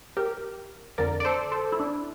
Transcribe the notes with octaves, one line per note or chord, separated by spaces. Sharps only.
G4 A#4
F2 D3 A#4 D5
D5
A4 C5
A4 C5
E4
D4